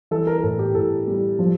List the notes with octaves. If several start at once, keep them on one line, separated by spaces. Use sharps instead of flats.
E3 A4
A#4
A#4
A2 A4
G4
A2 A4
G3
F3